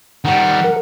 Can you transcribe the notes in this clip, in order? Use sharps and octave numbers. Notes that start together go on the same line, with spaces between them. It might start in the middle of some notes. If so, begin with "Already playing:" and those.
D#3 G3 F#5
A#4